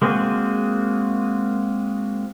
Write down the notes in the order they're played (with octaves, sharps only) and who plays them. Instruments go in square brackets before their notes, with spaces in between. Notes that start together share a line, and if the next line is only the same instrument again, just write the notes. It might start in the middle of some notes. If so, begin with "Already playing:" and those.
[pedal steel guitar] G#3 A#3 C4 F#4 G#4